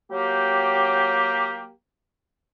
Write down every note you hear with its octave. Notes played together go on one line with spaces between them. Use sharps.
F#3 A#3 G4